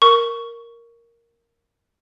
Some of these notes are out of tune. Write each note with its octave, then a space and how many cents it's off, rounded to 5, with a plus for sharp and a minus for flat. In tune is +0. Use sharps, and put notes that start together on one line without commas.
A#4 +0 C#6 +10